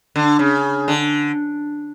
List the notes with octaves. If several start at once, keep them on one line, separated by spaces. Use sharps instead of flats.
D3
C#3
D3